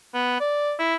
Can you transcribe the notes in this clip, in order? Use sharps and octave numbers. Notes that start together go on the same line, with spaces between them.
B3
D5
E4